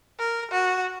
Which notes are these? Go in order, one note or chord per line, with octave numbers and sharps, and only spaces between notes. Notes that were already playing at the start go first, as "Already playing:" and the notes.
A#4
F#4